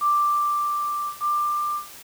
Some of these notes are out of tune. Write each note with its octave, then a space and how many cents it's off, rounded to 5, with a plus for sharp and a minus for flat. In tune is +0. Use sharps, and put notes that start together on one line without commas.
D6 +5
D6 +20